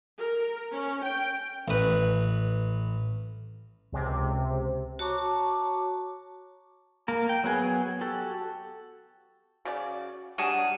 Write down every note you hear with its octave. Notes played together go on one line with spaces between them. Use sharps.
A#4
C#4
G5
A1 B4
C#2 C3
F#4 C#5 A5 A#5 C#6 D6
A#3 A#4
G5
F#3 B3 F#4 G#4
F#4 G4 A4
C#3 F#4 D5
F#3 G3 D4 G#4 F#5 C#7 D#7 E7